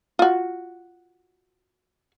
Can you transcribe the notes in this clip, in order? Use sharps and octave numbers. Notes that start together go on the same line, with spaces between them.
F4 F#4